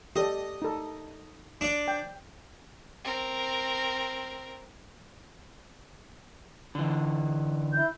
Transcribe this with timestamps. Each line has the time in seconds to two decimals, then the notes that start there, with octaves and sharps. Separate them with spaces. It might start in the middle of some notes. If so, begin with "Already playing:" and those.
0.16 G4 A4 D5 D#5
0.62 D#4 A4
1.61 D4 D5
1.88 G5
3.05 C4 A#4
6.75 D3 E3
7.72 E4 G6